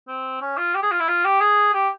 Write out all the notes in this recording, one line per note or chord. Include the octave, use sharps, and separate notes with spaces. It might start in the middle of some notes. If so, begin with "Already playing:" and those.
C4
C#4
F4
G4
G#4
F4
E4
F4
G4
G#4
G4